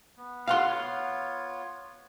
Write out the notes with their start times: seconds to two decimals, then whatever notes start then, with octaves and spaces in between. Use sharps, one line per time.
0.17 B3
0.47 F5 F#5 C6
0.68 B3 F4 C#5